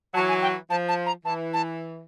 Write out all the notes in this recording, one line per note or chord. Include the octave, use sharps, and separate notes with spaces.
E3 F#3 A5
G#5
G5
F3 A5
A5
A#5
E3 A5
A5